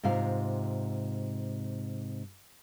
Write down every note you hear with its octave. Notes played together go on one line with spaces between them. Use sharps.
G#2 C3 F4 F5